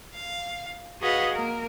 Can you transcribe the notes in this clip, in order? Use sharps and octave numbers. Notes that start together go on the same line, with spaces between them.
F5
F#4 G#4 B4 D#5 F5 F#5
A#3 A#4